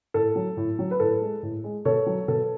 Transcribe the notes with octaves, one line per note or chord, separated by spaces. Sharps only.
A2 A4
F#3
A2
F#3
B4
A2 A4
G#3
A2
G#3
B2 A4 C#5
F#3
B2 A4